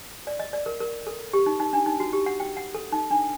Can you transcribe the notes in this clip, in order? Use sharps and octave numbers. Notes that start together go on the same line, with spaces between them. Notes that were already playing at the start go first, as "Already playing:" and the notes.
D5
D#5
D5
A#4
A#4
A4
G4
D#4
D#4
D4
D#4
F#4
G4
F#5
G5
F#5
A4
D#4
D4